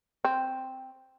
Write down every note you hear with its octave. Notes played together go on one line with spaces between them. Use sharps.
C4